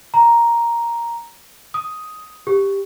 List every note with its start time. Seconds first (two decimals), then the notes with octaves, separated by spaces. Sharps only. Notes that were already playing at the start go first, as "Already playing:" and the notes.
0.14 A#5
1.74 D#6
2.47 G4